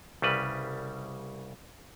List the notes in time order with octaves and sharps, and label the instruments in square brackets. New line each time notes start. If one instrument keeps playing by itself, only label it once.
[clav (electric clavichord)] C2 C#3 G3 B4